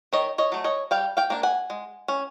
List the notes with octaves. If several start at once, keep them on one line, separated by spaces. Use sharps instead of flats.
D#3 C#5 D#5
C#5 D#5
F#3 A3
C#5 D#5
G3 F5 G5
F5 G5
A#3 D4
F#5 G#5
G#3
C#4